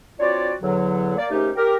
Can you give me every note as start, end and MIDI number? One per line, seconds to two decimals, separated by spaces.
0.19 0.52 60
0.19 0.52 62
0.19 0.52 65
0.19 0.52 66
0.19 0.52 73
0.19 0.52 74
0.62 1.13 40
0.62 1.13 50
0.62 1.13 54
1.16 1.25 58
1.16 1.25 74
1.30 1.50 39
1.30 1.50 44
1.30 1.50 57
1.30 1.50 61
1.30 1.50 63
1.30 1.50 67
1.55 1.75 67
1.55 1.75 70